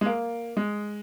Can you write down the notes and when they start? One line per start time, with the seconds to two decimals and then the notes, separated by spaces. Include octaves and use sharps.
0.01 G#3
0.06 A#3
0.57 G#3